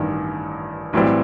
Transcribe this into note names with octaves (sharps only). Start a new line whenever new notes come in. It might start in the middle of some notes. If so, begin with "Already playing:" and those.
Already playing: A1 G2 D#3
B1 A2 E3 G3 C4